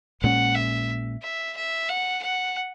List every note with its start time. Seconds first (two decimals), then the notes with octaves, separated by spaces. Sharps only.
0.22 A#1 A#2 G#3 C#4 F#5
0.55 E5
1.22 E5
1.56 E5
1.89 F#5
2.22 F#5